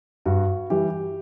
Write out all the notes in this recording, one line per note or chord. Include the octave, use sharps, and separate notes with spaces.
G2 F#4
E3 G3 G4